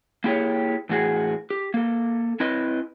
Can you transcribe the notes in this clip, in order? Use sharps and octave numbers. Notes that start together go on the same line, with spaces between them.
A#3 E4 G4 G#4 C#5
E2 A2 F#4 G#4
G4
A#3 A4
C4 E4 B4 D#5